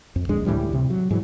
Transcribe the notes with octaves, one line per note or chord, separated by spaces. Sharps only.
F2
D1 A#1 G#3 D4
D2 A2 E3 G3
C3
F#3
G#2 E3 F#3